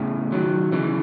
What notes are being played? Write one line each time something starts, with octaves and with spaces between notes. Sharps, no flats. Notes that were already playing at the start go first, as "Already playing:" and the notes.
Already playing: A2 C#3
D#3 F#3
C#3 E3